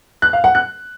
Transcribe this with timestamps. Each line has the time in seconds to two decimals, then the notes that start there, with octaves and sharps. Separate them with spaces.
0.22 F#6
0.33 F5
0.44 F#5
0.55 F#6